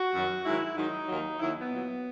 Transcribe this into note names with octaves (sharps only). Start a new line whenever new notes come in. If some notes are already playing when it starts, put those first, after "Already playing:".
Already playing: F#4
F#2 D#3 F#3
G#2 D#3 F#3 E4
G#2 D#3 F#3 D#4
D#2 D#3 F#3
D#2 D#3 F#3 E4
B3
A#2 F#3